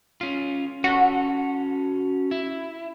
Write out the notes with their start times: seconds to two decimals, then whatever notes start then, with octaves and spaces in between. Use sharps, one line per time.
0.21 C#4 F4
0.84 C#4 F#4 A4
2.31 E4